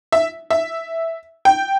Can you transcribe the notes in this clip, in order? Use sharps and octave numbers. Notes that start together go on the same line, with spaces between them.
E5
E5
G5